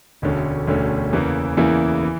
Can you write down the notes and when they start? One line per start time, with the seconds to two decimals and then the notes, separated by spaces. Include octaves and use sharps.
0.22 E1 D2 D3 A3 C#4
0.67 E1 D2 D3 A3 C#4
1.13 E2 C#3 E3 A#3 E4
1.57 E2 C#3 E3 A#3 E4
2.03 E3